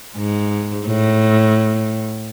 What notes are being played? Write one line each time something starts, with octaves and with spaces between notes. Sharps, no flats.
G#2
A2